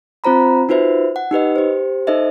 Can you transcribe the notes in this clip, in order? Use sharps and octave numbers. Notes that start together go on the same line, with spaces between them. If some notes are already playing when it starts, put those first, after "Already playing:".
C4 F4 C5 A#5 B5
D#4 F4 F#4 B4 C5 E5
F#5
D#4 G4 B4 D#5
G4 C5
D#4 A4 C5 D#5 E5